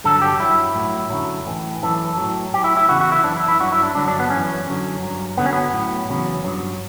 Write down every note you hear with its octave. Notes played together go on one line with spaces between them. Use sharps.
G2 D3 F#3 A4
G4
G2 F#3 E4
A2 F#3
F#2 D3 F#3
A2 E3
F#2 E3 A4
A2 F#3
A2 F#3 G4
E4
E4
E2 C#3 E3 F#4
F#4
E4
F#2 E3 D4
E4
E4
G2 F#3 F#4
E4
D4
G2 D3 F#3 D4
D4
B3
F#2 E3 C#4
F#2 D3 F#3
G2 F#3
F#2 D3 F#3 B3
C#4
B3
A2 F#3
E2 C#3 F#3
G2 F#3